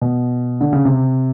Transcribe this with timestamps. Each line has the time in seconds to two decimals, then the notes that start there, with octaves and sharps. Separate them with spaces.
0.01 B2
0.61 D3
0.73 C#3
0.85 C3